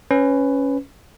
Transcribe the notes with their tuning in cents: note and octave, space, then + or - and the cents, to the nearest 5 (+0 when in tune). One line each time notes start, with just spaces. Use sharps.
C#4 +0 B4 +15